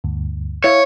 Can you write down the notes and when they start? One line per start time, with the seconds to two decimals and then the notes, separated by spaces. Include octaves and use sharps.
0.04 D2 G2
0.64 E4 C#5 E5 F5